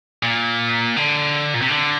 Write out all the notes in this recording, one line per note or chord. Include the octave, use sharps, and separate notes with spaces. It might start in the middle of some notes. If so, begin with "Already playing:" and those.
A#2
D3
A#2
C3
D3